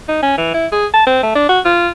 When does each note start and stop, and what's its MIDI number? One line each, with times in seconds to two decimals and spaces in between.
0.08 0.21 63
0.23 0.36 61
0.38 0.50 52
0.54 0.67 64
0.72 0.86 68
0.94 1.05 81
1.07 1.18 60
1.23 1.32 57
1.35 1.47 62
1.49 1.60 66
1.65 1.89 65